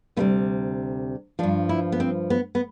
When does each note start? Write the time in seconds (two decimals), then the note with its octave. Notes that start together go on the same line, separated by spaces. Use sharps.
0.17 D2 C3 G3 B3
1.39 F3 D4
1.43 G2
1.69 E4
1.92 B3
2.00 C4
2.30 B3
2.55 B3